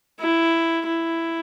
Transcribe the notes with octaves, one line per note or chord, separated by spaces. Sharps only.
E4
E4